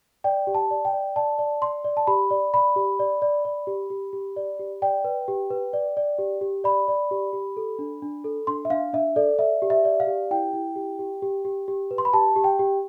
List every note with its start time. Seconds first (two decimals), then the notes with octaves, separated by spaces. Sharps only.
0.24 D5 G5
0.47 G4
0.54 A5
0.71 D5
0.85 G5
0.93 D5
1.16 D5 A5
1.39 D5
1.62 D5 C6
1.84 D5
1.97 A5
2.07 G4 B5
2.31 D5
2.54 D5 B5
2.76 G4
2.99 D5
3.22 D5
3.45 D5
3.67 G4
3.90 G4
4.13 G4
4.36 D5
4.59 G4
4.82 D5 G5
5.04 B4
5.28 G4
5.50 B4
5.73 D5
5.97 D5
6.18 G4
6.41 G4
6.64 D5 B5
6.88 D5
7.11 G4
7.33 G4
7.57 A4
7.79 D4
8.02 D4
8.24 A4
8.47 D4 C6
8.65 E5
8.70 D4 F5
8.93 D4 E5
9.16 A4 D5
9.39 D5 E5
9.62 G4
9.70 E5
9.85 D5
10.00 F5
10.07 G4
10.31 E4 G5
10.53 E4
10.76 G4
10.99 G4
11.22 G4
11.45 G4
11.68 G4
11.91 B4
11.98 C6
12.05 B5
12.13 G4 A5
12.36 G4
12.44 G5
12.59 G4